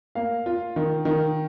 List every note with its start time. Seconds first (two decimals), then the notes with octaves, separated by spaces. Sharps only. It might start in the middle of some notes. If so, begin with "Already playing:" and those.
0.15 A#3 F5
0.46 F4
0.76 D#3
1.05 D#3